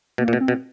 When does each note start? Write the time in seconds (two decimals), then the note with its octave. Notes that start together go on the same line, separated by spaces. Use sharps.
0.18 B2 A#3
0.28 A#2
0.33 B2
0.41 C4
0.48 B2